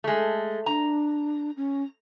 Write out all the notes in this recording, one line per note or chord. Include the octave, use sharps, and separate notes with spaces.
G#3 A3
D4 A#5
C#4